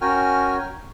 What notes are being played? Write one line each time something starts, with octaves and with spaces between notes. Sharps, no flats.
C#4 F#4 A#4 G5 G#5 F6